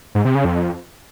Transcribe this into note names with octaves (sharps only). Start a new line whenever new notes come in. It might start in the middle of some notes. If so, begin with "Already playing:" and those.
G#2
C3
C#3
F2